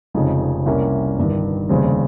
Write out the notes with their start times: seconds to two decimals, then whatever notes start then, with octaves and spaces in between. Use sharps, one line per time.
0.14 F1 F2 C#3 G#3 D#4
0.66 C2 C3 G3 A#3 C#4
1.18 G1 G2 D#3
1.69 F1 D#2 C#3 G3 C4